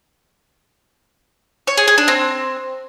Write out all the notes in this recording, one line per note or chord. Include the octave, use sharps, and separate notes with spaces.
C#5
G#4
G#4
D4
C4